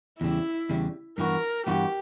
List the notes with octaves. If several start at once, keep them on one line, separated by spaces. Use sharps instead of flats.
E2 C#3 G3 E4
E2 C#3 G3
G2 E3 B3 F#4 A#4
G2 E3 B3 F#4 G4